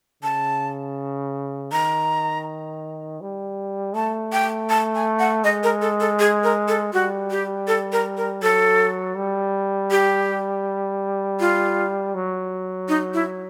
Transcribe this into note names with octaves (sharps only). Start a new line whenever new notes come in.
C#3 A5
D#3 A#5
G3
A3 A5
G5
A5
G#5
F#5
G#3 D#5
A#4
A4
A4
G#4
A#4
A4
G3 F#4
G4
A4
A#4
A#4
F#3 A4
G3
G4
F4
F#3
D#4
E4